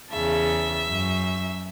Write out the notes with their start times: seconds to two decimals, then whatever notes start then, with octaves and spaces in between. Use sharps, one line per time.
0.12 E2 C#3 E5 A5
0.88 F#2